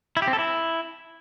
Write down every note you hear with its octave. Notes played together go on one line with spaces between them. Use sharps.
E4
G4
C4
A4
E4